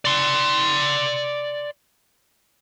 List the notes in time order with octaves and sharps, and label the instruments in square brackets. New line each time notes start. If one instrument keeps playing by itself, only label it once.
[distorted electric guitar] D5 C6